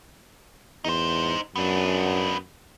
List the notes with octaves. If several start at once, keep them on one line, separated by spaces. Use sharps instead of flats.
E2 D#4 C5
F#2 B3 D4